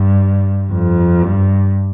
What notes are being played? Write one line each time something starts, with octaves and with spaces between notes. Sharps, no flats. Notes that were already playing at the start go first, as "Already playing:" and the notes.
Already playing: G2
F2
G2